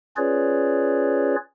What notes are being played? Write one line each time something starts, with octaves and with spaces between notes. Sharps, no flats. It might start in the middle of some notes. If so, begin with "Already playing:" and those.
C#4 F4 G#4 B4 C#5 D5